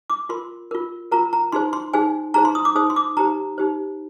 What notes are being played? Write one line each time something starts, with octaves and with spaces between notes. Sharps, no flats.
D6
F4 A#4 C6
F4 A#4
F4 A#4 A#5
A#5
D#4 G#4 C5 C6
C6
D#4 G#4 C5 G#5
D#4 G#4 C5 A#5
C6
D#6
D6
D#4 G#4 C5 D#6
C6
D6
D#4 G4 C5 A#5
D#4 G4 C5